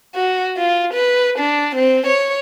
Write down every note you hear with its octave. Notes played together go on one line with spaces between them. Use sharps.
F#4
F4
B4
D4
C4
C#5